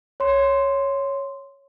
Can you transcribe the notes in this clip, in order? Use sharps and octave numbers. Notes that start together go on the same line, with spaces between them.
C#5 C6